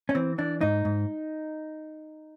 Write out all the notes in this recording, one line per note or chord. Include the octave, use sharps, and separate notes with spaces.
C#4
E3 C4
E3 D4
G#2 D#4
G#2